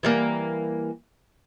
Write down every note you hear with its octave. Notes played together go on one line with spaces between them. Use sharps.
E3 G3 A#3